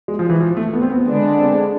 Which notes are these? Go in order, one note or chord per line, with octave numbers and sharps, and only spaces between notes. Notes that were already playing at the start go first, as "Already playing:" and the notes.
G#3
F3
E3
F3
A3
B3
C4
B3
D3 G#3 B3 D4
C4